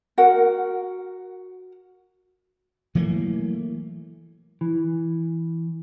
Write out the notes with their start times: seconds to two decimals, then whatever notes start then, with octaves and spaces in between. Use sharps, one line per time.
0.18 F#4 A#4 F#5
2.95 E3 F#3 A3 A#3
4.61 E3